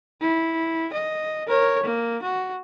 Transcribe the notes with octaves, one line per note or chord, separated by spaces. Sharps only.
E4
D#5
A#4 C#5
A#3
F#4